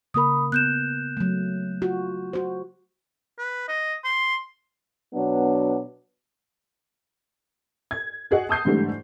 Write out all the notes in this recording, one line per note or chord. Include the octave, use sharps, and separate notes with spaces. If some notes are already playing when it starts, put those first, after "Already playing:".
C#3 A#3 A#4 B5 D#6
B3 F#6 G6 E7
F#3 A3
F4 F#4
F#4 C5
B4
D#5
C6
B2 F#3 B3 D4
G#6
F#4 G#4 D#5 F#5
A5 D#6 G6 C7
G#2 D3 E3 G3 A3